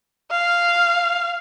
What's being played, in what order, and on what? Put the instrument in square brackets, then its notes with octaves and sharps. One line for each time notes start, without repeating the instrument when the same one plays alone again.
[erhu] F5